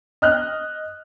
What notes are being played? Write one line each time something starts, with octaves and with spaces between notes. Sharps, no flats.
D#5 F6 F#6